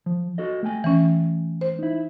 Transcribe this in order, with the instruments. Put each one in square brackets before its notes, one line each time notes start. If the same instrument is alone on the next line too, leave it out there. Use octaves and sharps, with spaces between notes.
[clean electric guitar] F3
F#4 A4 D#5
A3 G5 G#5
[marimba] E3 C#4
C5
[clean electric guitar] D#4 E4